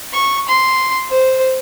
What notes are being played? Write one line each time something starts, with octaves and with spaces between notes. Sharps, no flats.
C#6
C6
C5